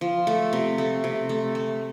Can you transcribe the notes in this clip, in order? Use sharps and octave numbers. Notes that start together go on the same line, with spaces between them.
F3
A3
C3
A3
C3
A3
A3